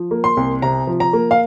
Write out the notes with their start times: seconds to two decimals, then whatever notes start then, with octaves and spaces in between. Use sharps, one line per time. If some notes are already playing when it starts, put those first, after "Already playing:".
Already playing: F3
0.11 A#3
0.24 C6
0.37 C2
0.62 C3 A#5
0.87 F3
1.00 A#5
1.13 A#3
1.31 F5